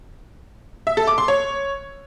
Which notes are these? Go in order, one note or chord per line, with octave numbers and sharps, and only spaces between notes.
E5
A4
D6
C6
C#5